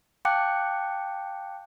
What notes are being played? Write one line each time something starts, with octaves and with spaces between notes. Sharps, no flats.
F5 G5 A5 D6 F#6 C#7